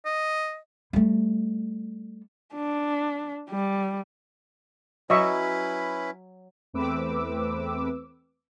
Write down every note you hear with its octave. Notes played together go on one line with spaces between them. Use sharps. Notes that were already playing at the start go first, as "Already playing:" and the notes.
D#5
G3 A3
D4
G3
F#3 C#4 E4 B4 D#5 E5 C#6
E2 A3 C4 B4 D6 E6